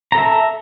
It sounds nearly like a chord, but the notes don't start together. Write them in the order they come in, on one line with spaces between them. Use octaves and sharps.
A#5 A4 E5